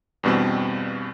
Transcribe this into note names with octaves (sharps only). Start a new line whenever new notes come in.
E2 G2 B2 G3 C4